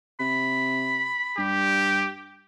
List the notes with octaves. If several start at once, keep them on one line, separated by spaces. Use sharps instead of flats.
C3 B5
G2 G4